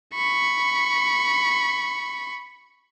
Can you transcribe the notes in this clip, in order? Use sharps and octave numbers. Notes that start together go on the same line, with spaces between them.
B5 C#6